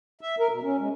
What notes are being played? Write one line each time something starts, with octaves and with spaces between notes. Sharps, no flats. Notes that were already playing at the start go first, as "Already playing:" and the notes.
E5
A#4
B2
C#4
G#3